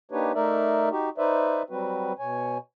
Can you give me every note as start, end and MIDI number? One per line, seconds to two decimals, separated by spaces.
0.11 0.32 58
0.11 0.32 62
0.11 0.32 63
0.11 0.32 67
0.11 0.32 71
0.11 0.32 73
0.35 0.89 57
0.35 0.89 63
0.35 0.89 70
0.35 0.89 74
0.35 0.89 76
0.91 1.09 63
0.91 1.09 66
0.91 1.09 67
1.18 1.62 63
1.18 1.62 71
1.18 1.62 72
1.18 1.62 74
1.18 1.62 76
1.70 2.13 54
1.70 2.13 55
1.70 2.13 60
1.70 2.13 66
1.70 2.13 71
2.19 2.58 47
2.19 2.58 73
2.19 2.58 80